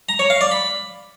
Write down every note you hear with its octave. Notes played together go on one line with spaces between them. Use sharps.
A#5
C#5
F5
D5
B5